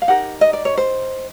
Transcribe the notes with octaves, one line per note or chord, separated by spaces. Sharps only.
F5
D#4 G4 A#4 F#5
D#5
D5
C#5
C5